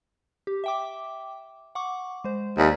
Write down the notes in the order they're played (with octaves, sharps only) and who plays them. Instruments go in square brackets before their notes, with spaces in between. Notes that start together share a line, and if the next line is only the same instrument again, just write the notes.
[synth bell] G4
E5 G5 D6
F#5 C#6 D6
G#3 C5
[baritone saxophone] D#2 [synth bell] C5 D5 B6